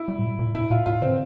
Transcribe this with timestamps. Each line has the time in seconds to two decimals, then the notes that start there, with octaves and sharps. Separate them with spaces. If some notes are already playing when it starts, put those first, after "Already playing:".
Already playing: E4
0.08 G3
0.19 A2
0.23 A#2
0.39 A#2
0.54 A#2 E4
0.71 A#2 F4
0.86 A2 F4
1.02 D3 C4